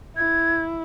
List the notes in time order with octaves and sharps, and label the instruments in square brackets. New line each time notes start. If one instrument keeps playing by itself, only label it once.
[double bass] E4 [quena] G#6